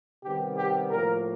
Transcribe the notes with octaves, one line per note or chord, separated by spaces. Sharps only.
C3 D#3 G3 B3 G4
G4
A2 F3 A#3 A#4